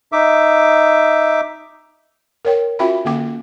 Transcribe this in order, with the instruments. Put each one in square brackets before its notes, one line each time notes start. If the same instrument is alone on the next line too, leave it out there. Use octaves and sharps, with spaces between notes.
[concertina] D#4 E5 D6
[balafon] A#4 C#5 G5
C#4 F4 F#4 E5 G5 B5
D3 A#3 C#4 G5 D6